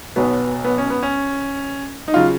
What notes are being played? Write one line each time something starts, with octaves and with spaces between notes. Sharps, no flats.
B1 B2 F#3 B3
B3
C#4
B3
C#4
D#4
C#3 F#3 F4